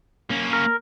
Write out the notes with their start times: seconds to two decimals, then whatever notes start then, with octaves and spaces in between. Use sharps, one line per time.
0.30 A#3 C#4
0.53 A#4